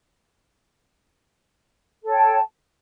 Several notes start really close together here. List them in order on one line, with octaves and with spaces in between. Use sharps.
A4 C#5 G5 A5